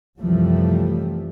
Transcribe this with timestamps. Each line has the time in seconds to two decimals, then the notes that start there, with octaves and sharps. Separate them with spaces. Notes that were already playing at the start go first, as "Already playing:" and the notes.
0.19 C2 F#2 E3 F3 G3 A3